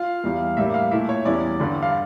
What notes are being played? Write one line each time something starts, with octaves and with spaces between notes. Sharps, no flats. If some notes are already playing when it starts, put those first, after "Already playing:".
Already playing: F4 F5
E2 E3 G3
A2 G3 A#3 D4 E5
F5
A#2 A3 E4 E5
C#5
E2 E3 G3 C#4 E4 D5
G2 D3 G3
F5